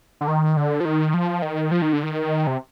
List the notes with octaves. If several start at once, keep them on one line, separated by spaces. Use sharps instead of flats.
D3
D#3
D3
F3
D#3
F3
D#3
F3
D#3
D3
D#3
C3